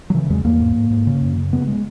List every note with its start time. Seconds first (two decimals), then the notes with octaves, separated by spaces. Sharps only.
0.10 F#3
0.14 C#3 E3
0.30 E2 G#3
0.45 E2 A#3
0.61 G#2
0.75 G#2
0.90 G#2
1.07 C#3
1.21 F#2
1.37 C#3
1.53 C#3 B3
1.68 G#3